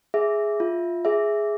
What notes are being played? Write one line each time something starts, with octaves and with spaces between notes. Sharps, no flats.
G#4 E5
F4
G#4 E5